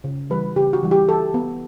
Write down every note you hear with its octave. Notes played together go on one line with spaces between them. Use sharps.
C#3
E3 G3 B4
C#3 G4
F#4
E3 G3
G4
E3 A4
B3